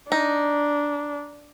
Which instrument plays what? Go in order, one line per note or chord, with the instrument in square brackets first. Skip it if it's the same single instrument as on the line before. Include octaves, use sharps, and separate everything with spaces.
[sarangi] D4 [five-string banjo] D#4